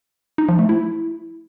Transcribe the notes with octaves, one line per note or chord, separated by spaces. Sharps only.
D#4
F3
A3
E4